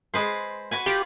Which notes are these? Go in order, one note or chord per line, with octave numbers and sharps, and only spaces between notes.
G#3 B4 C5
F#4 B4 G#5
F4 G4 F#5